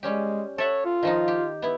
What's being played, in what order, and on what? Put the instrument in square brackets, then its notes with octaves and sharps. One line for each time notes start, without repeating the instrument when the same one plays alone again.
[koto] G3 C#4 G4 [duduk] G#3
[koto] A4 E5 F#5 [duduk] C#5
[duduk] F4
[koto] D#3 F3 D#4
G4
B3 E4